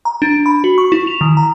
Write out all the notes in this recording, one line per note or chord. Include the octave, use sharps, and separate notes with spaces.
A#5
D4
B5
F#4
C#6
E4
F7
D#3
A#5